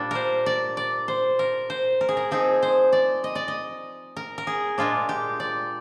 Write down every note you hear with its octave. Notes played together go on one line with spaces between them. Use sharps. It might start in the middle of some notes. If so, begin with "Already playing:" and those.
Already playing: A#2 G3 D4
A#4 C5
D5
D5
C5
A#4
C5
A#4
G#4
A#4
F3 C4 D#4 G#4
C5
D5
D#5
D5
D#5
A#4
A#4
G#4
A#2 G#3 D4 F4
G4
D5